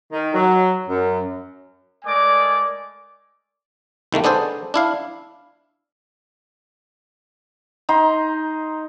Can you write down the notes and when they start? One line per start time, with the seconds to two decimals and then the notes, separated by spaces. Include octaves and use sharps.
0.13 D#3
0.34 F#3
0.89 F#2
2.05 G#3 A3 A#4 D5 G#5 D6
4.12 C2 D#3 A3 A#3
4.24 B3 D4 G#4 A4 C5
4.74 D4 E4 F5
7.89 D#4 A#5 C6